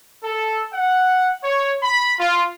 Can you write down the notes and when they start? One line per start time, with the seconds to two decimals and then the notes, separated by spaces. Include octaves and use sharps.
0.23 A4
0.73 F#5
1.44 C#5
1.82 B5
2.19 F4